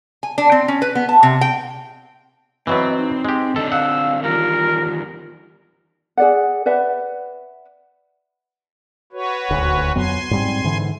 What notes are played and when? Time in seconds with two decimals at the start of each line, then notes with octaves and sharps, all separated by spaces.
0.23 G#5
0.38 D4
0.52 C4
0.68 C#4
0.82 B4
0.95 B3
1.09 A5
1.23 C3
1.41 G5
2.67 E3 F#3 B3 C4 D#5
2.97 D#4
3.25 G#3 G4
3.56 D3 C4 D4 A4 D#5
3.72 F5 F#5 E6
4.23 E2 D#3 G3 F4 A#4
6.17 G#4 D5 F#5
6.66 B4 D5 E5 F#5
9.12 F#4 B4 C#5
9.50 D#1 D2
9.96 F2 F#3 B3 G#5 C6
10.31 G#2 G3 C4
10.64 G#2 D3 E3